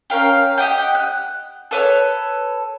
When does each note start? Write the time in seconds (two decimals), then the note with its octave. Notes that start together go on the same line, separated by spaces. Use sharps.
0.10 C#4 A#4 F5 G5
0.58 G4 D#5 F#5 G5
0.95 F#6
1.71 A4 B4 C#5